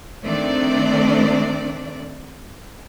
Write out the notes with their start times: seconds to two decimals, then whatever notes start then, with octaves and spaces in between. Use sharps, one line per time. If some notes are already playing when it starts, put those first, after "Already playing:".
0.25 D#3 A3 C4 D4 D5